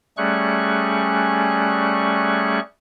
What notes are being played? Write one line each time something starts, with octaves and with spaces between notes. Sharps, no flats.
G3 A3 C#4 G#4 C#6 F#6